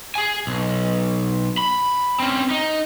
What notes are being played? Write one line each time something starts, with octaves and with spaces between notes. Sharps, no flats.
G#4 G#5
B1
B5
C4 C#4
D#4